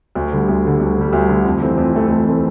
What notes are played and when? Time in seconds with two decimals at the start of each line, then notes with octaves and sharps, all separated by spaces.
0.15 D2
0.32 D3 G3
0.48 D2
0.65 D3 G3
0.80 D2
0.97 D3 G3
1.13 D2
1.29 D3 G3
1.45 F2
1.62 E3 A3 C4
1.77 F2
1.94 E3 A3 C4
2.10 F2
2.27 E3 A3 C4